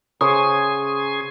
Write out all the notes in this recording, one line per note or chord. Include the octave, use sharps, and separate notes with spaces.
C#3 G#4 C5 C#5 F5 G#5 D#6